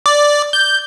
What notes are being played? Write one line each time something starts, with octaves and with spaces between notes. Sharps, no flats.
D5
G6